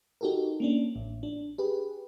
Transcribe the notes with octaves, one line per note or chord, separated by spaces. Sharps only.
D#4 F#4 G4 A4 A#4
A#3 C#4 D4
A1
D4
G4 G#4 B4